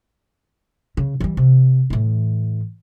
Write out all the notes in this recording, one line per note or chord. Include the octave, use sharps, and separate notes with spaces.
C#3
E3 G3
C3
A2 E3